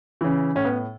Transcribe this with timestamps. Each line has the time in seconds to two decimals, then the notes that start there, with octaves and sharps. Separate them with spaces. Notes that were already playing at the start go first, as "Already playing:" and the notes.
0.21 C#3 E3
0.55 A2 C#4
0.65 B3